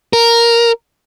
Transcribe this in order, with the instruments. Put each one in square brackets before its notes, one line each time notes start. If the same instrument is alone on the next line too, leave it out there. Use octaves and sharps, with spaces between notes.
[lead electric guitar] A#4